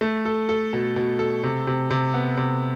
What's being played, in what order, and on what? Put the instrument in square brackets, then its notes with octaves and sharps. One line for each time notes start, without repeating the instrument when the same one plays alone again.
[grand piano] A3
A4
A4
B2
B2
A4
C3
C3
C3
B3
C3